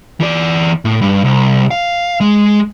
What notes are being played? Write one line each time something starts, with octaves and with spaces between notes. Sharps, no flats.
E3 D5
A2
G2
C2
F5
G#3